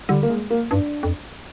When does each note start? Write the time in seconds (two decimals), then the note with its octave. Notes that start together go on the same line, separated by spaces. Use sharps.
0.09 D3 G3
0.23 A#3
0.30 G#3
0.50 A#3
0.71 G2 D4
1.03 F2